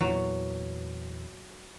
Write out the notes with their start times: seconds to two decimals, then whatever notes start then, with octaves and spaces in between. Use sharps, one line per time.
0.01 E2 A#2 E3 F#3